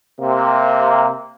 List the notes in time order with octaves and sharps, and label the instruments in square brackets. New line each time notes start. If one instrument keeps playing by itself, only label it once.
[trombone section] C3 A#3